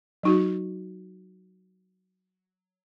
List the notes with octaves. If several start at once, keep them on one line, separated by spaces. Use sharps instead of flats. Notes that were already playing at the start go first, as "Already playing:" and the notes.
F#3 D#4 F#4